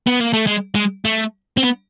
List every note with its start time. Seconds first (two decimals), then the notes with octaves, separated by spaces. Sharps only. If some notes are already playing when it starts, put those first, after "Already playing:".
0.07 B3
0.20 A#3
0.33 A3
0.47 G#3
0.75 G#3
1.05 A3
1.57 C4
1.63 B3